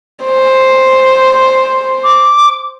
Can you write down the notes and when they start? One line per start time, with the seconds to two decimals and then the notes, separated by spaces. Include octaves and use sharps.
0.24 C5
2.04 D6